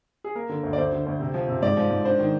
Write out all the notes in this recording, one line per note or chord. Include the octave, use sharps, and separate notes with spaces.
G#4
A#3 A#4
D3
D2
D5
D2 C5
D3
D2
C3
F3
C3
G#2 D5
F3
G#2
D4 C5
D#3